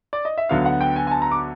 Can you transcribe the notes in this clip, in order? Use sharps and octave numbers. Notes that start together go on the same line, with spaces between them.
D5
D#5
E5
D2 D3 F#3 B3 F5
F#5
G5
G#5
G#5
A5
A#5
D6